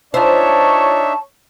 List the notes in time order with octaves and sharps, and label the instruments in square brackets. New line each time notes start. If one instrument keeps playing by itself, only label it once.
[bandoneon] D4 D#4 E5 [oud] F4 C5 [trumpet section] C#5 [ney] A5